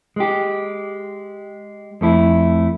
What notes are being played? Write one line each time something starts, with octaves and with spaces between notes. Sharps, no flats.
G#3 G4
F2 A3 E4